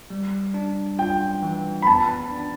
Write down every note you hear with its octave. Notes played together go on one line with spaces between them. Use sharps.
G3
D4
F4 G5
E3
B5
B3 A5
D4